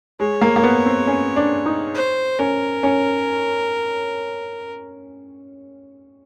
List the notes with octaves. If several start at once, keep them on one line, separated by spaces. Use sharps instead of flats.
G#3 C#5
A#3
A#3
B3
C4
C#4
D4
D#4
C5
C#4 A#4
C#4